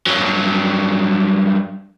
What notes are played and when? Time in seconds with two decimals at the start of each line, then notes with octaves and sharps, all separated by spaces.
0.06 G2 F#3